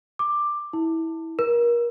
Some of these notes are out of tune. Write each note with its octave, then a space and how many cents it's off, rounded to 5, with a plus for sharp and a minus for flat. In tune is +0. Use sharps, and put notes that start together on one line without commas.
D6 +10
E4 -20
A#4 +30